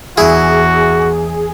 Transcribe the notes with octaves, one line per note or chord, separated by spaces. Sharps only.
E2 E4 F#4 G#4